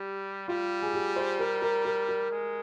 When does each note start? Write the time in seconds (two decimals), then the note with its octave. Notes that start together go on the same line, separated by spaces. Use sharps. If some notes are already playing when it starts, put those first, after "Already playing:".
Already playing: G3 G4
0.48 G3 F4
0.82 G#4
0.94 G4
1.16 C5
1.39 A#4
1.62 A#4
1.85 A#4
2.09 A#4
2.31 G#3